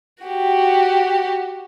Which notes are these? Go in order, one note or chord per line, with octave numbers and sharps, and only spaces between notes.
F#4 G4